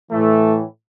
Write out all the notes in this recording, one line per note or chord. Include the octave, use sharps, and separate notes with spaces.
A2 E3 A3